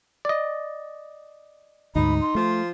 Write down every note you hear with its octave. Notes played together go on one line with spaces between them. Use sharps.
D5 D#5
D2 G#2 D#4 B5
C6
F3 A3 F4